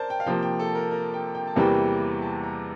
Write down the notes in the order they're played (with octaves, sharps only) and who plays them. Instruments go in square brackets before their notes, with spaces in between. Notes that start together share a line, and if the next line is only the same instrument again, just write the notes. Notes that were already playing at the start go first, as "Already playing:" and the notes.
Already playing: [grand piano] A#4 C5 D5 A5
G5
F5
[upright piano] C3 F3 A#3 [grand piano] G5
[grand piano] G5
A4
A#4
A#4
G5
G5
A5
[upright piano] E2 C3 E3 G3 A#3 [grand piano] G5
[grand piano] A5
A#5